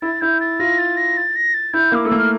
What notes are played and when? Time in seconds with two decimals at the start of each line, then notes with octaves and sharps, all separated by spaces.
0.02 E4 A6
0.21 E4 G6
0.40 A6
0.60 F4 A#6
0.78 A6
0.97 A#6
1.17 A6
1.36 A#6
1.54 A6
1.73 E4 G6
1.92 A#3
1.95 D6
2.05 A3 E6
2.12 A#3
2.18 F6